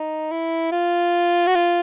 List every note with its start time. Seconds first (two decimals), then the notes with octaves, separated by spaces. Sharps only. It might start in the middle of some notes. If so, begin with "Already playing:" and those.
Already playing: D#4
0.31 E4
0.72 F4
1.47 F#4
1.55 F4